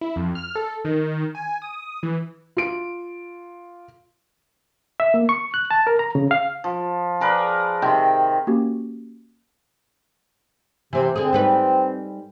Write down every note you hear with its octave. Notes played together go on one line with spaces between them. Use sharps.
E4
F2
F6
A4
D#3
G#5
D#6
E3
F4 D7
E5
A#3
C#6
F#6
A5
A#4
A#5
C#3
F5
F3
G#4 A#4 B4 D5
C3 D#3 G5 C6
A#3 C#4 F#4 G4
C3 E3 C4
D3 C4 G#4
G#2 G3 B4